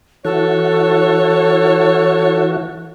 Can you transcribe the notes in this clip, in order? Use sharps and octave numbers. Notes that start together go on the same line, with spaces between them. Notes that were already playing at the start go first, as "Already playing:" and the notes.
E3 F#4 A4 C#5